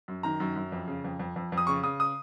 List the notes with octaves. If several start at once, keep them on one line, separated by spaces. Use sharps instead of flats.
F#2
D#3 A#5
F#2
F#2
F2
C#3
F2
F2
F2
F2
D#6
C#3 C#6
C#3 D#6
D#6